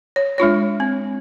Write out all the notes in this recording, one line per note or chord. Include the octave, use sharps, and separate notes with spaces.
C#5
G#3 D4 F4 C#5
C4